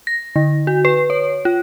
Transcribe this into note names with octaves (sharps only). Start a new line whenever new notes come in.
A#6
D3
F#4
B4
C#5
F4